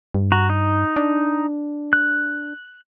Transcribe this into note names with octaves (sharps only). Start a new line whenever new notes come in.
G2
F#4 A#5
D#4
D4
F#6